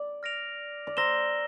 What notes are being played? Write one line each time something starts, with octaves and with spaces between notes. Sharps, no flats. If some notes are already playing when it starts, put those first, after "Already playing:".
Already playing: D5
F6 A#6 D7 F7
D5
C5 A#5 E6 A#6 E7 G7